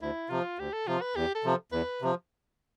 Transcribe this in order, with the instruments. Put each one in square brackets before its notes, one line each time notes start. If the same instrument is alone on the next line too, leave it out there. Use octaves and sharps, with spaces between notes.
[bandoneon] D2 [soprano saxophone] E4
[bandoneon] C3 F3 [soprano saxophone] F4
[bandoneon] D2 [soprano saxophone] G4
[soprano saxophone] A4
[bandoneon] C3 F3 [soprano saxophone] F4
[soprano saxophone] B4
[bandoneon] E2 [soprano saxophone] G4
[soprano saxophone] A4
[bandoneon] C3 F3
[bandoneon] E2 [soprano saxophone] B4
[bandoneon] C3 F3